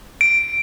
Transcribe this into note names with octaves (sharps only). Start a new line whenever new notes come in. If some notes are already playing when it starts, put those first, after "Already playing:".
D7